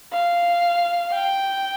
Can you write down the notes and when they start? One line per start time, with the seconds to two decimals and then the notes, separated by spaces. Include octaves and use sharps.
0.13 F5
1.14 G5